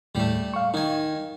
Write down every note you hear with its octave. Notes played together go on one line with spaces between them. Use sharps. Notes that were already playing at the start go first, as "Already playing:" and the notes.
D#2 A2 G3 A3
F5 C#6
D#3 D#4 G#5